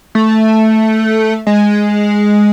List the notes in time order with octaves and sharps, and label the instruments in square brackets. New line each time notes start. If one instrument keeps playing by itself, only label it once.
[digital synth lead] A3
G#3